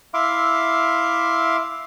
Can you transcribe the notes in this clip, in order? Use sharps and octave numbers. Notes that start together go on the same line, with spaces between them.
E4 E5 F5 C6 D6